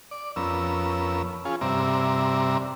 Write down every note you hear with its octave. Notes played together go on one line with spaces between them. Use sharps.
D5
F2 B3 C#4 A#4 E6
C#4 F4 G#4
G2 C3 C4 D5 E5 A#5